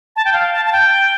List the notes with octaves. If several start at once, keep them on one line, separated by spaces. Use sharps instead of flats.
A5
G5
F5
A5
A5
G5